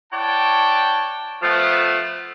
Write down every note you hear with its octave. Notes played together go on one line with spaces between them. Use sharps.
E4 C#5 D5 F#5 G5 A5
F3 A3 B3